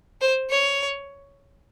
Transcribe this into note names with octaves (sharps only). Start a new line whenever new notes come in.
C5
C#5